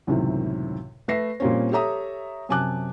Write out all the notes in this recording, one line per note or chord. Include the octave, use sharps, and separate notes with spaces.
C#2 F#2 A2 C3 D#3
A3 B4 E5 A#6 C7
A#2 G3 A#3 C4 C#4
G4 A4 C#5 E5 A#5 D#6
F#2 C3 G#5 A5 D6 F#6